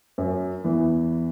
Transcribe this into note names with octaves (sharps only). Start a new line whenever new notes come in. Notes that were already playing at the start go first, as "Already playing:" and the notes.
F#2 F#3
E2 E3